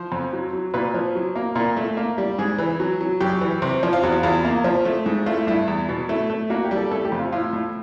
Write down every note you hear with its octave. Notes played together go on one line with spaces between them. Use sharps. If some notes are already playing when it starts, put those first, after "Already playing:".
Already playing: F3 C5
F2
F#3
F#3
A#2 B4
F3
F#3
A#3
A#2 A#4
A3
A#3
G3
G#2 G#4
E3
F#3
F#3
F#2 G4
E3
C3
F3
F4
E2 F#4
E2 F4
A#3
F3
A3
G#2
A3 F4
E4
G2 E4
E2
B2
A3 E4
A3
A#3 F#4
G4
G3
A4
A3 A4
G4
F2
F4
A2 F4
A2